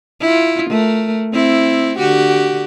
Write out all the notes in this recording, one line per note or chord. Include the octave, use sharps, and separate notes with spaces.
E4 F4
A3 A#4
C4 E4
D3 F#4 G4